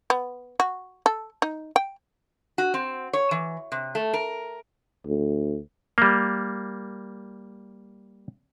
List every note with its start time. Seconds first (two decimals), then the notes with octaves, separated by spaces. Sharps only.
0.10 B3
0.60 F#4
1.06 A4
1.42 D#4
1.76 G5
2.58 F#4
2.74 C4
3.13 C#5
3.31 E3
3.72 C3
3.95 A3
4.14 A#4
5.06 D2
5.98 G3 A#3